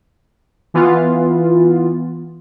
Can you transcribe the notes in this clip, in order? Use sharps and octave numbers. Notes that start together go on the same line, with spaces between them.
E3 B3 F4